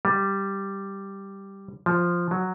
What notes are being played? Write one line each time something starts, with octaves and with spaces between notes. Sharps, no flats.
G3
F3
F#3